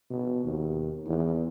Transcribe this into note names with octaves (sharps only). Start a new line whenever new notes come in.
B2
D#2
E2